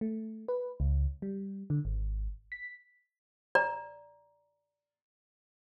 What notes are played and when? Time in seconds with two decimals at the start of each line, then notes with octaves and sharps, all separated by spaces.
0.01 A3
0.48 B4
0.80 C#2
1.22 G3
1.70 D3
1.85 G#1
2.52 B6
3.55 D5 A#5